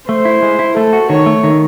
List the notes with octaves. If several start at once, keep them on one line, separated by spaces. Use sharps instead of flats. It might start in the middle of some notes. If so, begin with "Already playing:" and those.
A3 C5
E4
G#3
E4
A3 A4
F#4
D#3 C#5
A3
D#3